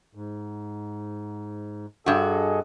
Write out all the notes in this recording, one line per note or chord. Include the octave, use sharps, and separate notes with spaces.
G#2
G2 F#4 G#4 A4 D#5